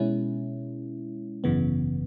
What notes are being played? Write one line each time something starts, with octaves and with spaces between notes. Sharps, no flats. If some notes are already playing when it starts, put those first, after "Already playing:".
Already playing: B2 G#3 C#4 E4
G#1 F#2 C#3 E3 B3